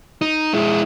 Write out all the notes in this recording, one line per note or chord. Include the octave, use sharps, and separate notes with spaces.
D#4
G#3 E4